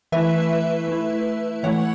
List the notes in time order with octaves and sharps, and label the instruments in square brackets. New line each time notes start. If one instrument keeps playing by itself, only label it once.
[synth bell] E3 A3 E4 B4 E5
A3 E4
E3 A3 E4 C#5 F#5